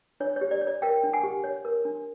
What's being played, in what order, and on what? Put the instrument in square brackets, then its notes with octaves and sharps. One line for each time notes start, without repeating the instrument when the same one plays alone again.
[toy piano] D4 C#5
C#5
G4
D5
C#5
D5
A#4 F5 G5
D4
F#5 G#5
G4
C#5
A#4
D4